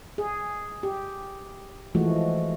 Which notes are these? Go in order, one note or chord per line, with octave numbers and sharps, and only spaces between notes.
G#4
G4
E3 F3 G#3 A3 F#4